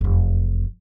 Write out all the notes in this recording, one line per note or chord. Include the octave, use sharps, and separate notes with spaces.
F1 E2